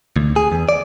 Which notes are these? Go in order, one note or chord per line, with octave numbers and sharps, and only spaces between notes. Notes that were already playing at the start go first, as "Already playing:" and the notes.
D2
G#4
E2
D5